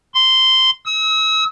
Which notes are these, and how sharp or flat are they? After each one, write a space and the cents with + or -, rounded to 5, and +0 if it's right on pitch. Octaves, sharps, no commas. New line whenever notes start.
C6 -10
E6 -40